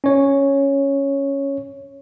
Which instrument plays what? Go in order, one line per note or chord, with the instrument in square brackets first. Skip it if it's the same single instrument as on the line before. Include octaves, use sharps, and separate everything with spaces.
[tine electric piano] C#4 C#5